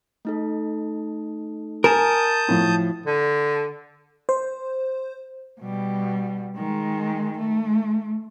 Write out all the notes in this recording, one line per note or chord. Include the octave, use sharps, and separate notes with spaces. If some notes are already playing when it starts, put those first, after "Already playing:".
A3 D#4 A4
A#4 G#5 A5 D#6 G6 E7
A2 F3
D3
C5
B2 G3
D#3 G#3
A3